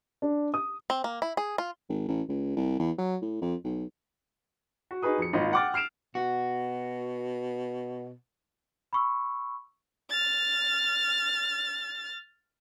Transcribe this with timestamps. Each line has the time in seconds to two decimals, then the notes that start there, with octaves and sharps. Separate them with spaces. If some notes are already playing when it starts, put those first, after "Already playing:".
0.22 D4
0.54 D#6
0.90 C4
1.04 A#3
1.22 E4
1.37 G#4
1.58 F4
1.89 G#1
2.08 A1
2.28 C#2
2.56 C2
2.79 E2
2.98 F#3
3.22 A2
3.41 F2
3.64 B1
4.91 F#4
5.02 D#4 F#4 G#4 B4 D#6
5.18 F2 C#7
5.33 D#1 G#1 F4 D#5 B5
5.53 F#5 G5 D6 F6 A6
5.74 F6 C7 D7 E7 F7
6.15 B2 F#4
8.93 B5 C#6 E6
10.10 F6 A6